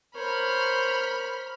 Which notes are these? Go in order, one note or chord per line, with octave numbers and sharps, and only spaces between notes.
A#4 C5 C#5 B5 F6